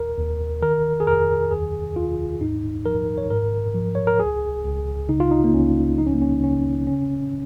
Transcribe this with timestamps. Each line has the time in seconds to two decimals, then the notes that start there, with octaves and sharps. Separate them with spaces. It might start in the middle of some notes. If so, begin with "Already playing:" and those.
Already playing: D#2 A#4
0.17 D#2
0.62 D#3 A#4
1.00 G#4
1.07 F2 A#4
1.51 D#2 G#4
1.96 D#2 F4
2.41 G#2 D#4
2.86 F3 A#4
3.18 C#5
3.30 G#2 A#4
3.74 F3
3.95 C#5
4.07 A#4
4.20 C#2 G#4
4.64 C#2
5.09 C#3 D#4
5.20 F4
5.31 D#4
5.44 A#3
5.53 C#2 C#4
5.98 F3 D#4
6.06 C#4
6.14 A#3
6.22 C#4
6.43 C#3 C#4
6.87 C#3 C#4